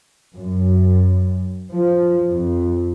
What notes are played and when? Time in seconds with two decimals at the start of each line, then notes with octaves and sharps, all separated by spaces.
0.35 F#2
1.70 F3
2.31 F2